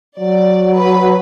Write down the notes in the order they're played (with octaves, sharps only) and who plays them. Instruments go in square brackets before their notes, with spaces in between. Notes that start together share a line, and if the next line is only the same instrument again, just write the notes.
[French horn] F#3 [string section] D5
[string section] B4